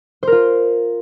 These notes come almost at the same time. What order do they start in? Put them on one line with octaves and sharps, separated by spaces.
C5 A#4 F4